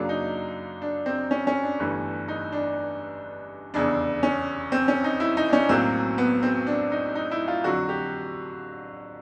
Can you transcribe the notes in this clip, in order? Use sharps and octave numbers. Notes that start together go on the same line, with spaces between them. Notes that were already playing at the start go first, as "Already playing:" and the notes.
Already playing: F#2 C#3 F#3 A#3 D4
D#4
D4
C4
C#4
C#4
D4
G1 G2 E3 A3
D#4
D4
F1 E2 C#3 D4
C#4
C4
C#4
D#4
E4
D#4
D4
C#4
B1 A2 F#3 A#3 C4
B3
C4
D4
D#4
D#4
E4
F4
F2 D3 F#3 F#4
G4